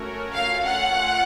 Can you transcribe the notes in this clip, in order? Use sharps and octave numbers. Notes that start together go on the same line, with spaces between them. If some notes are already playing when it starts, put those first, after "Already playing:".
Already playing: A3 C#4 F#4 A#4 C#5
A3 C#4 F4 F5
F#5